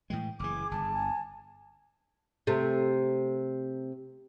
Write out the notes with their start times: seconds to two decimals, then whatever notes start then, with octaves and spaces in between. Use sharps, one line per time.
0.10 A2 E3 G#3 G5
0.39 F#1 E3 G#4 D6
0.71 G1 A5
0.93 G#5
2.47 C3 A3